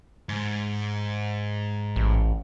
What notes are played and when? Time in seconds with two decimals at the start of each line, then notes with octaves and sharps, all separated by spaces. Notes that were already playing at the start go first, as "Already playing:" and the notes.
0.29 G#2
1.96 A1